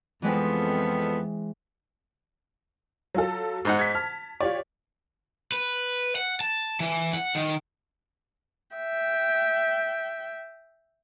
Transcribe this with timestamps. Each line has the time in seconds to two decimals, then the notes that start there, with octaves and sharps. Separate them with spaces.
0.22 F2 E3 G#3 B3 C4
3.14 F#3 F4 A4
3.65 G#2 D#4 F#5
3.79 G#6 B6
3.95 A5 F6
4.41 F4 G4 C#5 D5
5.52 B4
6.16 F#5
6.41 A5
6.80 E3
7.13 F#5
7.35 D#3
8.76 E5 G5